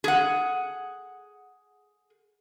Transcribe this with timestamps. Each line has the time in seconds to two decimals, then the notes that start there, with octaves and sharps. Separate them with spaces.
0.04 G#4 F#5